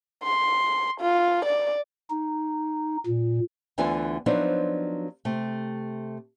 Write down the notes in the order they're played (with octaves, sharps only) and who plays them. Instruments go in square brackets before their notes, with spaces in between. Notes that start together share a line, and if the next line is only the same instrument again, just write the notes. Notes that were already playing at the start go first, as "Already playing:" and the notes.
[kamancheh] C6
F4
D5
[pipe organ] D#4
A#2
[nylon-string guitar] D2 D3 E3 B3 F4 G#5
F3 F#3 B3 C4 D4 D#4
C3 A3